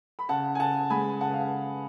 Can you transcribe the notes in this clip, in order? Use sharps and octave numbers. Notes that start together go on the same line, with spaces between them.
B5
C#3 F#5 A5
G#5
C#3 F#5 A5
G#3 G#5 B5
C#3 F#5 A5
F5